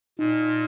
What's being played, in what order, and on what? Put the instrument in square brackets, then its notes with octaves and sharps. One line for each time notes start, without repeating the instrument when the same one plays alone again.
[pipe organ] A#2 [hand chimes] D#4